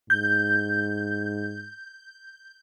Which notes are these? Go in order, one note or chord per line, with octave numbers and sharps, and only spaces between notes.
G#2 G6